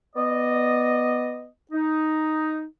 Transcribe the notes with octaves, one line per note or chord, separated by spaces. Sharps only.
B3 D5 D#5
D#4